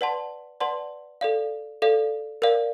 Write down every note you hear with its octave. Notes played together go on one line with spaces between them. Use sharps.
B4 D5 F#5 A5 C6
B4 D5 F#5 A5 C6
A4 D5 F5
A4 D5 F5
A#4 D5 F5